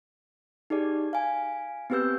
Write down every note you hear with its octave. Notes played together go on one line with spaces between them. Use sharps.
D#4 G4 G#4 D5
F5 G#5
B3 C4 G4 B4 E6 G6